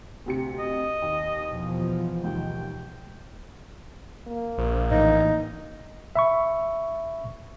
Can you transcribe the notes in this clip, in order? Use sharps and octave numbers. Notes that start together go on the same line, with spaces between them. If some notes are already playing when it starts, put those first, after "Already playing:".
D2 C3 C#7
D#5
D#2
E2 B2 F3
D#2 G#2 G5
A#3
A#1
A2 E3 D#4
E5 B5 C#6